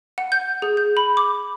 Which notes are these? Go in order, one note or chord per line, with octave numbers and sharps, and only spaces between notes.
F#5
G6
G#4
G6
B5
D6